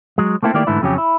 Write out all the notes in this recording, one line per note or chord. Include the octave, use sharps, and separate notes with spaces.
F#3 G#3
A3 A#3 C4 E4 A4
D#3 A3 A#3 E4 G4 D5
G#2 D3 E3 A3 E4
F2 C#3 F#3 C#4 G4
E4